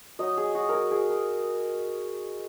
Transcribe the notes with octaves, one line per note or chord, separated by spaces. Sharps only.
F#3 D#4 D#5
G#4
F#4
G#4 A#4
G#4
A#4